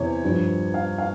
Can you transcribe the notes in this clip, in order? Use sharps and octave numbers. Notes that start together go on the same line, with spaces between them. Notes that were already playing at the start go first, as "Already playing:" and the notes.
Already playing: E2 C3 C#5
G2 F3
F5
F5